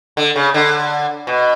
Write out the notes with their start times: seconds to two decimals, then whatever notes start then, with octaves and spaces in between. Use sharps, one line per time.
0.17 D3
0.36 C#3
0.54 D3
1.27 B2